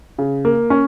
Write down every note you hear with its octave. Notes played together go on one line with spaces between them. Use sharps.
C#3
A#3
C#4